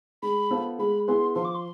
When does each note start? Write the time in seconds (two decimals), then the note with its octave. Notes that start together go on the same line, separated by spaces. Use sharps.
0.22 G#3 B5
0.51 B3 F4 A4 C5
0.79 G#3 B5
1.07 B3 E4 G#4 B4 C6
1.35 F3 C6
1.45 D6
1.54 C6